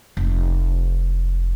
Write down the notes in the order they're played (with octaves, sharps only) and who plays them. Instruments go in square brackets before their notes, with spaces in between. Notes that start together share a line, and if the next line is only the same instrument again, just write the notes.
[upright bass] F1